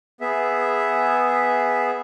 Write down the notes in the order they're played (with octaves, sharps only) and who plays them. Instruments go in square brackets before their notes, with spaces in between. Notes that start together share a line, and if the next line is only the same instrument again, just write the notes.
[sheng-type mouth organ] B3 G#4 E5